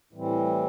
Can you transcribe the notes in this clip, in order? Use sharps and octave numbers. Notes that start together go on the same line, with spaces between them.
A2 E3 G3 C4